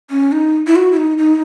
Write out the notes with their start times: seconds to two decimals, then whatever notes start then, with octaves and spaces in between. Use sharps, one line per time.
0.11 C#4
0.32 D#4
0.67 E4
0.76 F#4
0.92 E4
0.97 D#4
1.18 D#4